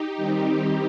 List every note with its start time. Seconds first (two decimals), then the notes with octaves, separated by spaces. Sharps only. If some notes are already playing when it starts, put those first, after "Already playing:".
Already playing: D#4 G4
0.16 D#3 G3 C4